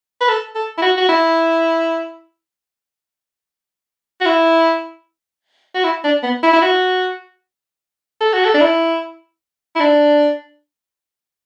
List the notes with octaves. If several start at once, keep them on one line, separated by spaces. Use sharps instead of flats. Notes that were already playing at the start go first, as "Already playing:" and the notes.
B4
A4
A4
E4
F#4
F#4
E4
F#4
E4
F#4
E4
D4
B3
E4
E4
F#4
A4
F#4
A4
D4
E4
E4
D4